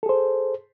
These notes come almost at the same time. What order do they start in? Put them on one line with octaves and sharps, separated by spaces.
A4 G#4 C5